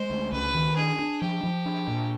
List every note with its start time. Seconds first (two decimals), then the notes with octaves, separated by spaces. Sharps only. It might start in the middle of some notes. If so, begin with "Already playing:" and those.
Already playing: G#3 C5
0.10 D2
0.32 C#2 B4
0.55 D#3
0.76 D4 G#4
0.99 D4
1.21 F3 G4
1.43 F3
1.66 D4
1.88 A#2